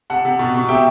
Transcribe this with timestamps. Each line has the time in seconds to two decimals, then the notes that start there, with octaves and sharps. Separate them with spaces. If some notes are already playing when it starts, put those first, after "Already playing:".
0.10 C3 F#5 A5
0.25 C3
0.39 B2
0.54 B2
0.69 C3 E5 G5